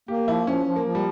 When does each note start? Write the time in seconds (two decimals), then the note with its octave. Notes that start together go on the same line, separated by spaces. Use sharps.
0.08 A#3 G4
0.27 F3 E4
0.47 F3 C#4
0.66 F3
0.76 A#3
0.85 F3
0.95 G3